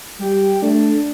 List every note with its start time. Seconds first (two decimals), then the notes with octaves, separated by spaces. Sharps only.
0.20 G3 G4
0.62 A3 D4